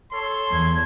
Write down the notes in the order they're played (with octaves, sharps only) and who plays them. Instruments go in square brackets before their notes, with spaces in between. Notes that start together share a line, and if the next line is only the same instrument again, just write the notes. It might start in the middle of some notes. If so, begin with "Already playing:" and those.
[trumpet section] A4 C#5 C6
[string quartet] E2 G#6